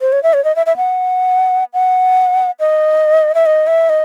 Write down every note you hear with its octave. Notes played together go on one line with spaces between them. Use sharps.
C5
C#5
E5
C#5
D#5
E5
E5
F#5
F#5
D#5
E5
D#5
E5
D#5